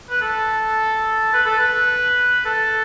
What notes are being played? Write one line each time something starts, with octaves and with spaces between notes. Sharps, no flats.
B4
A4
B4
A4
B4
A4